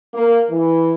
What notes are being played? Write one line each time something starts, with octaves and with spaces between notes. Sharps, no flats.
A#3
E3